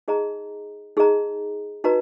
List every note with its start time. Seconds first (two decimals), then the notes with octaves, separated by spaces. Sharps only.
0.08 D#4 G#4 D#5 A#5
0.97 D#4 G#4 D#5 A#5
1.84 D#4 F#4 B4 D#5 A#5